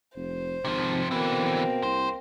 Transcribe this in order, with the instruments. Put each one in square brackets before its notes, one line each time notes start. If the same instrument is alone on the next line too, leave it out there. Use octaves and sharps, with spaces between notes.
[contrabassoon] F1 [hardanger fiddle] C5
[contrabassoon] G#1 [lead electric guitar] C3 F3
[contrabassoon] B2 [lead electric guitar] D3 E3 [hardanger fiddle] A#3 C4
[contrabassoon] C2 [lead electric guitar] C5